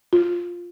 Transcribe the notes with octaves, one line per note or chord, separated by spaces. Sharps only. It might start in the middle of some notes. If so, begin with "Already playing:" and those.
F4